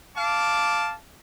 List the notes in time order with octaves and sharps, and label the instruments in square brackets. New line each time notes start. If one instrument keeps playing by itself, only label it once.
[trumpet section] F5 A5 D6